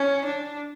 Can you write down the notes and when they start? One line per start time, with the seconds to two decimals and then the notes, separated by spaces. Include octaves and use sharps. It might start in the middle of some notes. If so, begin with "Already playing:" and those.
Already playing: C#4
0.25 D4